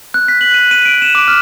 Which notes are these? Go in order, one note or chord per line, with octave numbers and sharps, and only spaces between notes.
F#6
B6
F#7
D#7
D#7
D7
E7
D6
F6